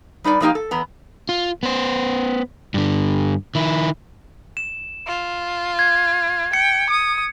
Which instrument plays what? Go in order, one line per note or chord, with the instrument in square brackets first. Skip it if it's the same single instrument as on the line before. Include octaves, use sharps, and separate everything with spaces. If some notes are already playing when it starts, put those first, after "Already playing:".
[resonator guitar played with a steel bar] G3 D#4 B4 D5
F3 F#3 A#3 D#4 G4 F5
A4
E2 B3 A#5
[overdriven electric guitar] F4
B3 C5
G2 D3
D#3 E4
[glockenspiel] E7
[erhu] F4
[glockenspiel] G#6
[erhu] G5 [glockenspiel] C#7
[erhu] D#6